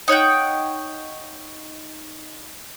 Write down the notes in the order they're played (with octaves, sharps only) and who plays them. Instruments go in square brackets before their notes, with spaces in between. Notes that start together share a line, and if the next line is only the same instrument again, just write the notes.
[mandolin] D#4 C#5 F#5 G5